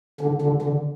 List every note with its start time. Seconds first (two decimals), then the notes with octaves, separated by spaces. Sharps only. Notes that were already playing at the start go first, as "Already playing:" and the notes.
0.21 D3
0.42 D3
0.62 D3